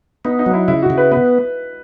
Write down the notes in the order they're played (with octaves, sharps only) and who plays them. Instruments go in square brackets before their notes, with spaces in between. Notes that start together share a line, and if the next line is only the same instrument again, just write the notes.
[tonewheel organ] B3 [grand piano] D#4
[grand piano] D#4
[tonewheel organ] F#3
[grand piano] E4
[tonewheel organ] C#3 [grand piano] E4
[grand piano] F#4
[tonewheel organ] C#3
[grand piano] B4
[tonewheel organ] B3 [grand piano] B4